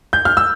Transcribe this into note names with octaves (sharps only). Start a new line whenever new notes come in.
G6
F6
E6